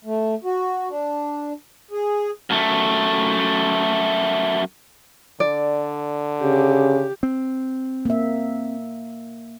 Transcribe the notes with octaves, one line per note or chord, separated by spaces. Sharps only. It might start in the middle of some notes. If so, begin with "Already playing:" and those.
A3
F#4
D4
G#4
F#2 A3
D3 D5
C#3 G4
C4
A#3 E5